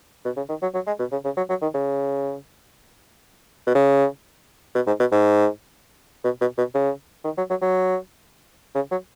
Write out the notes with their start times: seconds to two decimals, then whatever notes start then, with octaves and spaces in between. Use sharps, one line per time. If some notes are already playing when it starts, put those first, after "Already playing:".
0.25 B2
0.36 C#3
0.49 D#3
0.62 F#3
0.74 F#3
0.87 G#3
0.99 B2
1.12 C#3
1.24 C#3
1.37 F#3
1.49 F#3
1.62 D#3
1.74 C#3
3.67 B2
3.75 C#3
4.75 B2
4.87 G#2
5.00 B2
5.12 G#2
6.24 B2
6.41 B2
6.58 B2
6.74 C#3
7.24 D#3
7.38 F#3
7.50 F#3
7.62 F#3
8.75 C#3
8.91 F#3